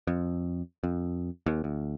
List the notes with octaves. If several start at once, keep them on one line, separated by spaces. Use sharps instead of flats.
F2
F2
D#2
D2